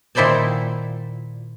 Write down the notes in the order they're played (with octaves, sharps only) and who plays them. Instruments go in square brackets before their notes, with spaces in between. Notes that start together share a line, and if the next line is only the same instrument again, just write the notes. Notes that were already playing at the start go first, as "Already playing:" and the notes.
[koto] A#2 D#3 E4 C5 D5 A5